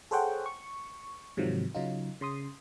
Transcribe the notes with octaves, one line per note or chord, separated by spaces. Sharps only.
G#4 A4 C5 C#5 F#5 G5
C#6
G#2 C3 D#3 F3 F#3
C#3 F#3 D#4 F4
C#3 C6 D#6